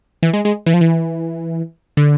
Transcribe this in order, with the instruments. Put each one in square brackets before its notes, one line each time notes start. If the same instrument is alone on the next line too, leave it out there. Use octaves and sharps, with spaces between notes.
[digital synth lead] E3
G#3
G#3
E3
F3
E3
D3